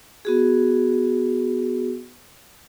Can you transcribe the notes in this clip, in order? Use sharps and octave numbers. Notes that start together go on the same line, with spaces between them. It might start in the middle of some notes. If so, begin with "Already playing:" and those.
B3 F#4 G#4